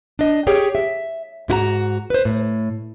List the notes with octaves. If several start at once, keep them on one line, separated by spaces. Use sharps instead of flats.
D4 D#5
G4 G#4 C#5 G5
E5
G#2 E4 F#4 A#5
B4 C5
A2